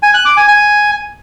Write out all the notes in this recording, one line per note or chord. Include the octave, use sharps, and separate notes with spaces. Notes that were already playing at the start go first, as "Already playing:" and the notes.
G#5
F#6
D6
G#5
G#5